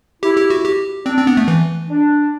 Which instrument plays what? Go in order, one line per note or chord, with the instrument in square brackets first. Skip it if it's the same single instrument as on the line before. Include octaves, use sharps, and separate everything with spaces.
[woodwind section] E4 [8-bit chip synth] G4
[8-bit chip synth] G4
F#4
G4
[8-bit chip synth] C4 [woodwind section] D4
[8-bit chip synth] C4
B3
A3
E3
[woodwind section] D4